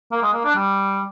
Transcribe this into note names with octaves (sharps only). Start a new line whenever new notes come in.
A#3
G#3
A#3
D4
G3